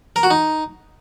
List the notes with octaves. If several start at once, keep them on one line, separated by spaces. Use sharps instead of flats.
A#4
F#4
D#4